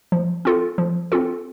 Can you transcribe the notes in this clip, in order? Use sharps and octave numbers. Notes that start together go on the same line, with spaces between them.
F3
C4 F4 A4
F3
C4 F4 A4